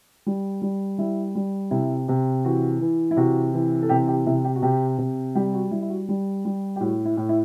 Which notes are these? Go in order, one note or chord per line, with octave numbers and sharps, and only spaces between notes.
G3
G3
G3 E4
G3
C3 E4
C3
E3 F#4
E3
E4
C3 F#4
E3
A4
C3 G4
G4
C3 E4
G4
F#4
C3 G4
C3
G3 G4
F#4
G3 E4
E4
F#4
G3
G3
G4
A2 F#4
E4
A2
E4